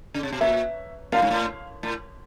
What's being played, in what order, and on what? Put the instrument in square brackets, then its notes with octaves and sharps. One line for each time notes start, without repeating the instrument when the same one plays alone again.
[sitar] C#3
C3
B2
[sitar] A#2 [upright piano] E5
[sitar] A2 [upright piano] F5
[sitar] G#2
A2
A2